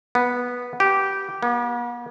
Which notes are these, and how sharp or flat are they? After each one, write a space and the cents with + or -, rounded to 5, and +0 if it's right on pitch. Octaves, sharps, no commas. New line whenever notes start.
B3 -10
G4 -10
B3 -45